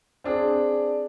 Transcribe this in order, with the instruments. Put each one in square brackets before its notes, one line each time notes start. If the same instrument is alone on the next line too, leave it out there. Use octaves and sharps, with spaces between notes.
[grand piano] C4 D4 G#4